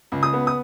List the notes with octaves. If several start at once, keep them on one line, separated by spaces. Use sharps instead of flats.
C#2
D#6
B3
D#6